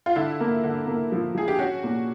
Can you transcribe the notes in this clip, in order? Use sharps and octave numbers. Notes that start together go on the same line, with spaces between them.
F4
D3 E4
A#3
D3
A#3
F3
F3 G#4
G4
C#4 F#4
A#2